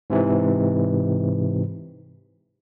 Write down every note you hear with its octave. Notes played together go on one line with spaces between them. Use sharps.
G#2 C3 E3